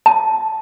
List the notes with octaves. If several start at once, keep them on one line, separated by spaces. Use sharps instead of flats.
A5